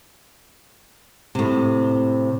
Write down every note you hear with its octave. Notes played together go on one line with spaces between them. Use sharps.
A2 C3